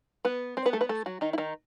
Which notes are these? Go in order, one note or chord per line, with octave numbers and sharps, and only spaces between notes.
B3 B4
C4 C5
B3 B4
A3 A4
B3 B4
A3 A4
F#3 F#4
D#3 D#4
E4
D#3 D#4